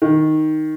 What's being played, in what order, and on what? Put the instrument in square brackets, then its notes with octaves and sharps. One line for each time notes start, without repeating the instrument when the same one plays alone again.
[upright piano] D#3